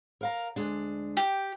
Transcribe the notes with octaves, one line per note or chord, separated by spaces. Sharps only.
A#4 F5 A#5
D2 G#3 D4
G4